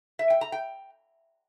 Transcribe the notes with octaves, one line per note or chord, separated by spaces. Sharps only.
E5
G5
A#5
G5